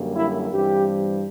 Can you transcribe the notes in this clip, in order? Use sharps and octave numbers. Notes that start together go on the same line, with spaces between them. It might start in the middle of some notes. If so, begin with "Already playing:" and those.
Already playing: F#2 D3 G3 A#3
E4
G2 E3 G3 C4 G4